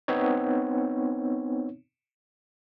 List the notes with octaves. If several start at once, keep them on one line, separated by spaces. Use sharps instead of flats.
B3 C4 D#4 C#5